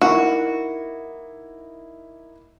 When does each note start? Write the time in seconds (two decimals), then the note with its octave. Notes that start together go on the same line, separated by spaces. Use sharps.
0.01 A#3 D#4 E4 F#4